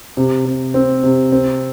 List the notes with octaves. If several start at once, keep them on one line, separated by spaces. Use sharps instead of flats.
C3
C3
C4
C3
C4